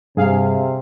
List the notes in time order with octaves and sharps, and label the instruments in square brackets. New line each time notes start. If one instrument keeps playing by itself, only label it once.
[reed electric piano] G2 [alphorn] C3 [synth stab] G#4 F5